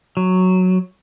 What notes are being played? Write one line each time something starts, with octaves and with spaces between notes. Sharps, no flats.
F#3